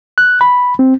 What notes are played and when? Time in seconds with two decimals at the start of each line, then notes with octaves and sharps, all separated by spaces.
0.18 F#6
0.41 B5
0.79 C4